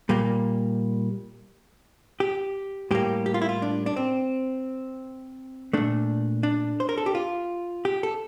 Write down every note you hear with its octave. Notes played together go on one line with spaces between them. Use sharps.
A#2 G3 A#3
G4
A2 G3 A#3 G4
G4
F4
E4
F4
D4
D4
C4
A#2 A3 D4
D4
C5
A#4
A4
G4
F4
G4
A4